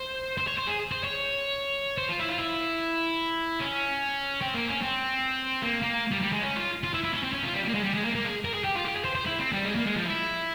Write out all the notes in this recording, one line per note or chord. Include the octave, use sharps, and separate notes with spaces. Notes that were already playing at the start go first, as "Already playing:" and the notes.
Already playing: C5
C5
C#5
C5
G#4
C5
C#5
C5
F4
E4
F4
E4
C#4
C4
A#3
C#4
C4
A#3
A#3
G3
G3
G#3
C#4
F4
F4
E4
E4
C#4
C4
C#4
F4
G3
G3
A#3
G#3
G3
G#3
A#3
A#3
G#4
A#4
G#4
G4
F4
G4
G#4
C5
C5
E4
C4
G3
G#3
A#3
G#3
F3
E4